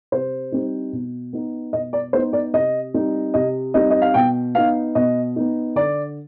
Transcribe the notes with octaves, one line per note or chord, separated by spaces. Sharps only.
C3 C5
G3 C4 D#4
B2
B3 D#4
B2 D#5
D5
B3 D#4 C5
D5
C3 D#5
G3 C4 D#4
C3 D#5
G3 C4 D#4 D#5
D#5
F5
B2 G5
B3 D#4 F5
B2 D#5
B3 D#4
D3 D5